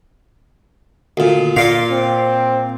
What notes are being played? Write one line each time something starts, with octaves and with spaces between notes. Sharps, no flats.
D2 A#2
A#2 F4 D5 F5
C4